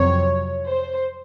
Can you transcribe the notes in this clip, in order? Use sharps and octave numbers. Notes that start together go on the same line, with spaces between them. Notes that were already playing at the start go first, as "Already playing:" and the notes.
Already playing: F2 C3 F#3 C4 C#5
C5